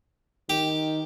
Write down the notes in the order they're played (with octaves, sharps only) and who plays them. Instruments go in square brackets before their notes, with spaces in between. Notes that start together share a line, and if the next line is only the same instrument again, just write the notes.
[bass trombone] D#3 [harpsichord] G4